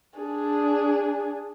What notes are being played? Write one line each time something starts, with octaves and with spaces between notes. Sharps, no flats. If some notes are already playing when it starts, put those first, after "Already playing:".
D4 G#4